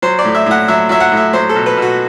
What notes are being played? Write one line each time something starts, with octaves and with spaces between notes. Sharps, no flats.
F#3 C5
D5
A2
E5
A2 F#5
F#3 E5
F#3 E5
F#5
A2
E5
F#3 C5
A4
B2
B4
B2
F#4